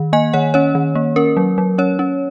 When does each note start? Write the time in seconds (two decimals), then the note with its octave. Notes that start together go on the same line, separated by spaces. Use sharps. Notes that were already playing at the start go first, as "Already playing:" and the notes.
Already playing: D#3
0.13 A#3 D#5 G#5
0.33 D#3 C#5 F#5
0.54 C#4 C#5
0.75 D#3
0.95 A#3
1.16 C#4 A#4
1.37 F#3
1.58 F#3
1.78 C#4 C#5
1.99 C#4